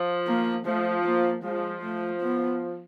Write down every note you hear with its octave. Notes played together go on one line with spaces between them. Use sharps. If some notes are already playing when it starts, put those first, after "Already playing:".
Already playing: F3
A#3
F3 A3
A#3
F3 G#3
A3
B3